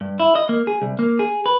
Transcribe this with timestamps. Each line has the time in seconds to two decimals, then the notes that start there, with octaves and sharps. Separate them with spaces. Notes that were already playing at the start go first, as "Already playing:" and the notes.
0.01 G2
0.20 E4
0.35 D#5
0.49 A#3
0.67 G#4
0.82 C2
0.99 A#3
1.19 G#4
1.46 B4